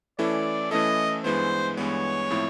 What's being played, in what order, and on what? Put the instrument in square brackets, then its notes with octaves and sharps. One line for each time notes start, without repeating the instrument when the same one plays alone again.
[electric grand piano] E3 A3 C#4 E4 A4 [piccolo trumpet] D5
[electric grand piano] E3 A3 C#4 E4 A4 [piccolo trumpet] D#5
[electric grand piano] G2 E3 G#3 B3 [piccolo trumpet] C5
[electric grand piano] G2 E3 G#3 B3 [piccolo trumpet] C#5
[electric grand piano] A2 F3 A3 C4 E4